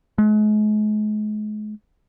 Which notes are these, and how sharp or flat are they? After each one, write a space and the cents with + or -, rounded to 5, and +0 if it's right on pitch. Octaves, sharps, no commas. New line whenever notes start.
G#3 +40